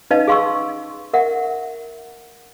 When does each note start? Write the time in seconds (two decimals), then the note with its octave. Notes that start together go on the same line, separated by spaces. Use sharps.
0.10 C#4 D#4 B4 D#5 F5 A5
0.27 G#4 F5 C6 C#6 E6
1.13 A#4 E5 F#5